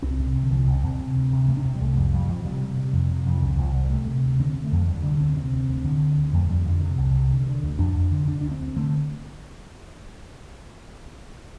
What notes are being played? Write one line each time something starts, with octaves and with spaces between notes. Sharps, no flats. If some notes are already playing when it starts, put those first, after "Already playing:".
C2 C4
C3
C3
D3
C2 F3
C2
C4
C2
C3
D2
C3
C3 A3
D4
C3 C4
G3
C2 A3
F2 G3
F2 G3
F2 F3
C3 G3
C3
C3
F2
C3
F2
F3
C2 D3
C2 F3
C3 G3
C3 A3
C3
D2
D3 C4
D3
A3
F2
F3
D2 G3
D3 G3
D2 C4
C3 C4
D2
D2
D3
D2
D2
F2 A3
F2 G3
F2 D3
C3
C2
C3
D3
D3
D2
F2 D4
F2
D3
D3 D4
D2 D4
C4
D2
D3 A3